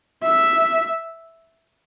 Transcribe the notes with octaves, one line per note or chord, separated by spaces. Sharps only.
E5